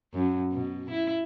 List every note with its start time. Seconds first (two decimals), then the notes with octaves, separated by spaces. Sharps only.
0.13 F#2
0.52 B2
0.90 E4